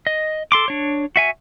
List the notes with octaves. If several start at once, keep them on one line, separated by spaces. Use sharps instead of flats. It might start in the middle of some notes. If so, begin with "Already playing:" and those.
D#5
A4 C6 D6
D4 C#5
F#4 E5 G#5